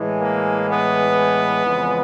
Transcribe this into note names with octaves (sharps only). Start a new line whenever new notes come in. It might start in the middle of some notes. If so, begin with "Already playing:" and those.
Already playing: A2 E3 G#3
A#3
B3
F2 C#3 E3 G#3